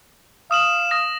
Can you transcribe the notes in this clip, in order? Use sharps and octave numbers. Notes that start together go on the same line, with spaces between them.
F5 D#6 E7 F#7
D#6 A#6 E7